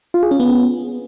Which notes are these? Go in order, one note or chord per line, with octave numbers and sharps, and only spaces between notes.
F4
G#4
C#4
B3